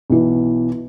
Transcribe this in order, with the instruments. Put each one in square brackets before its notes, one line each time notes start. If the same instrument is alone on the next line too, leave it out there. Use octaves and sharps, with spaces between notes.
[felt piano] B1 E3